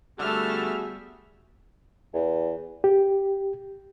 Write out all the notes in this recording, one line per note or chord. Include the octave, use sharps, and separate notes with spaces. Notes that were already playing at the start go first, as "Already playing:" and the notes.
D3 G3 A3 B3 F#4 G#4 E5 F6
E2
G4